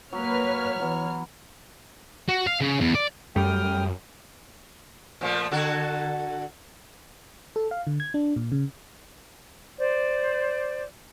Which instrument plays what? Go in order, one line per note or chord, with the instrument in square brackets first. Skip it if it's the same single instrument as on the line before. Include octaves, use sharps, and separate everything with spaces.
[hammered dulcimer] F#3 [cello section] A#3 B4 [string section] C#5 F6
[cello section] E3 [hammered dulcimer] F#3 B3
[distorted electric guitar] F#4
F5
C#3
E2
D5
[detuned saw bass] F#2 [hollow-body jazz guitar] G3 A3 [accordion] G5 D#6 F6
[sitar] A#2 F3 A3
D3 F#4 A4
[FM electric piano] A4
F5
D3
G#6
D4
A#2
C#3
[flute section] C5 D5